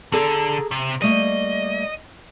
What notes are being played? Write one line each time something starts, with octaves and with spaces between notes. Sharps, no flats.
D3 G#4 A4 A#5
C3
G3 A3 A#3 D#5